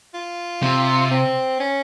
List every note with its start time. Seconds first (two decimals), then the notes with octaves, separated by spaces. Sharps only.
0.14 F4
0.63 C3
1.11 C4
1.60 C#4